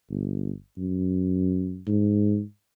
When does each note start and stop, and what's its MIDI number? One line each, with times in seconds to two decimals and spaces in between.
0.10 0.52 31
0.77 1.81 42
1.87 2.42 44